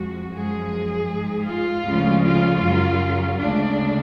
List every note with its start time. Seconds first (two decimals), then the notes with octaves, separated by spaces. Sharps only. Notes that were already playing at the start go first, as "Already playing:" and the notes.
Already playing: F2 F3 G#3 F#4
0.33 F#2 F3 G#3 G#4
1.09 G#2 G#3
1.48 F4
1.86 D2 C#3 F3 G#3
2.25 F4
2.63 F#2 C#3 F#3
3.39 D2 C#3 G#3 D4